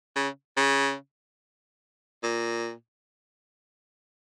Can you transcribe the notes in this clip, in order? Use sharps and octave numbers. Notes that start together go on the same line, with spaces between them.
C#3
C#3
A#2